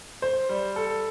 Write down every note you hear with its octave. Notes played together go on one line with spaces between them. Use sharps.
C5
G3
A4